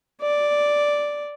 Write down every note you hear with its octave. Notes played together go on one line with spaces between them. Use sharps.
D5